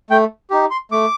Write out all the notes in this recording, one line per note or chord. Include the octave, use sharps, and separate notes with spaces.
A3 G5
D#4 G4
C6
A3 D6